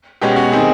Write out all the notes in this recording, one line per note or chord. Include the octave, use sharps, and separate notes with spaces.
B2 G#3 C#4 G4
F#4
D#3 G#3 C4 D#4 G#4